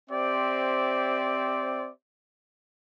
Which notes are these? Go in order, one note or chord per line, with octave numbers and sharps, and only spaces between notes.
C4 G4 C5 D5 E5